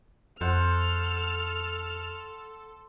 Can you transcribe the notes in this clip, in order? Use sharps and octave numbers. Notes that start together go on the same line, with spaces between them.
F2 A4 C5 F#5 F6